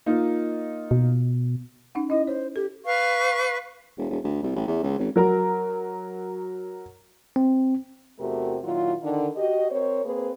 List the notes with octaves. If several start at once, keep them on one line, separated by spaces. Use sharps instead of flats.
A#3 D#4 F4
B2
C#4 D#4 F#5
C#4 E4 D#5
C5 C#5
G4 A4
B4 F5 C#6
E1
E1
D2
C2
A1
E2
C#2
G#1
F#3 A#4 A#5
C4
E2 C3 A3 F#4 G4 A#4
A#2 D#3 F#3 E4 F4
D3 D#3
F#4 G4 D#5
C4 A#4 C5 C#5
A#3 C4 G#4 B4